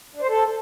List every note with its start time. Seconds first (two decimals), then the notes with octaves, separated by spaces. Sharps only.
0.15 D4
0.22 C5
0.28 A4